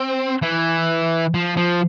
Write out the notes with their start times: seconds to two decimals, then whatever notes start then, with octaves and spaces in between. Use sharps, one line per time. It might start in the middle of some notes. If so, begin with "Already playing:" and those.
Already playing: C4
0.42 E3
1.34 F3
1.57 F3